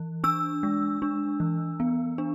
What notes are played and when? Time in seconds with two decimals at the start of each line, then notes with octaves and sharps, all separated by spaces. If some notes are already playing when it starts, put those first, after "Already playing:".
Already playing: E3
0.24 D4 E6
0.63 G#3
1.02 D4
1.40 E3
1.80 B3
2.18 D4